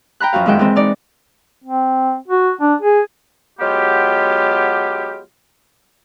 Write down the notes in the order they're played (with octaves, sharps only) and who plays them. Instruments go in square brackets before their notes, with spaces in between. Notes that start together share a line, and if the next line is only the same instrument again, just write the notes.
[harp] G5 A#5 B5 F#6
F#2 F3 F#4 F5
F2 D#3 G#3 E5 F#5 G5
E3 G#3 C4
E3 D#4 D5
[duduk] C4
F#4
D4
G#4
[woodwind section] F#3 G#3 B3 F4 G4